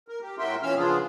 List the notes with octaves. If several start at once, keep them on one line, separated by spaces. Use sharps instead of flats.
A#4
G4
A2 F#4 A#4 E5 G5 C6
A#2 E3 C#4 F5 E6 F6
C#3 F3 B3 D4 F4 G#4